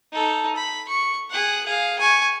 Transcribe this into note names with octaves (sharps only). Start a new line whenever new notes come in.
D#4 A4
B5
C#6
G#4 F#5
G#4 F5
G#5 C#6